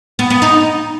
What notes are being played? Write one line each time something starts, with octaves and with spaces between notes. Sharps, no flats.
B3
B3
D#4